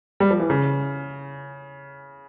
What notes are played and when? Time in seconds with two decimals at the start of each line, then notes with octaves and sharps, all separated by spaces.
0.20 G3
0.31 F3
0.40 E3
0.50 C#3